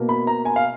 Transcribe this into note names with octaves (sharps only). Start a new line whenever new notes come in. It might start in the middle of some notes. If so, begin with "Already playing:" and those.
Already playing: B2 A#3
B5
A#5
G#5
F5